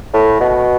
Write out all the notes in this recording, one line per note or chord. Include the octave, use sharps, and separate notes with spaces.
A2
B2